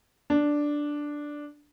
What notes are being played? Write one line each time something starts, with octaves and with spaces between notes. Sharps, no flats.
D4